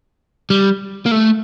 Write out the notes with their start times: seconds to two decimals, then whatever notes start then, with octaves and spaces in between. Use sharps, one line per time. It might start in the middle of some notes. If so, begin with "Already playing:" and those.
0.50 G3
1.06 A#3
1.11 A3